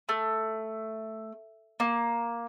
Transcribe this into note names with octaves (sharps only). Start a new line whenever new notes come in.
A3
A#3